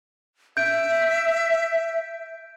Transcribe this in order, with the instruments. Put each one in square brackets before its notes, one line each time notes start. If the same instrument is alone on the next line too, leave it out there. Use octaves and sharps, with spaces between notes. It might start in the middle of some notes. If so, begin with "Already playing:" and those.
[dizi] E5 [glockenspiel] G6 D7